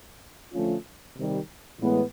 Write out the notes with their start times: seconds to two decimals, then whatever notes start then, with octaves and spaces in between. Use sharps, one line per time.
0.52 D3 F3 A3 C#4 F4
1.16 C3 D#3 G3
1.80 A2 E3 G#3 B3